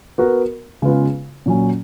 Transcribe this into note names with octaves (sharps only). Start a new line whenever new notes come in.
B3 F#4 A#4
C#3 G#3 B3 F4 B4
A#2 F#3 C#4